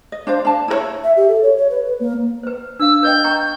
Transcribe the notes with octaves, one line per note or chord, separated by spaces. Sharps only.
D#5
D4 C5 F5
D4 A5
E4 A#4 C#5
E5
G4
A4
C#5
C#5
B4
B4
A#3
B4 C5
D4 F5 E6
B4 D#5 G5 G6
G5 A#5 C#6
G6